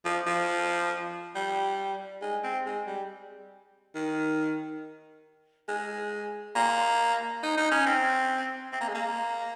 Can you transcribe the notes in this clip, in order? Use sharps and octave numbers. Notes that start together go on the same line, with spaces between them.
F3
F3
G3
G#3
C4
G#3
G3
D#3
G#3
A#3
D#4
D#4
C#4
C4
C4
A#3
G#3
A#3